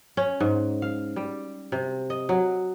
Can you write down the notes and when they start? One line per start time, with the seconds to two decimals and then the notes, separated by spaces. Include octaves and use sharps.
0.17 C#4
0.40 G#2
0.82 F5
1.16 G3
1.72 C3
2.10 D#5
2.29 F#3